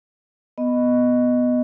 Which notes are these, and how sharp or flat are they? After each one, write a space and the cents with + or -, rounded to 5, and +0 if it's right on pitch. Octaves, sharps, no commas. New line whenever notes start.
B3 +5 D#5 -10